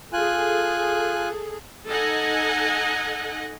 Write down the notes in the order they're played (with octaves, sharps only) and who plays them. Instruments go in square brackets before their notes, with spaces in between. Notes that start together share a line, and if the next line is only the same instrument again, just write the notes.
[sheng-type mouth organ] F4 G#5 F#6 [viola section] G#4 A4
[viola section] D#4 A4 D#5 F#5 G#5